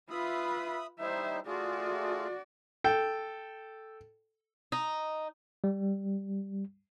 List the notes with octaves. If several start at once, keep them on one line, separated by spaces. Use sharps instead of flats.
F4 B4 E5 B5 D#6
G3 D#4 E4 C5 E5
A3 F4 F#4 G#4 D5
A4 G5
D#4
G3